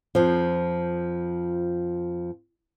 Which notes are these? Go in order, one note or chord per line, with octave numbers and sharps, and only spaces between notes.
F2 F3